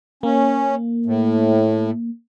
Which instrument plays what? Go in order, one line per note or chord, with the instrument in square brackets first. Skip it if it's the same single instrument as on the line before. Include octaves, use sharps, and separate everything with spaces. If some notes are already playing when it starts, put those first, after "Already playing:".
[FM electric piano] A#3 [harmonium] C#4
[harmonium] A2